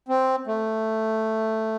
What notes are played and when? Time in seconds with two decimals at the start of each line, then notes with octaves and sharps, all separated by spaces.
0.09 C4
0.47 A3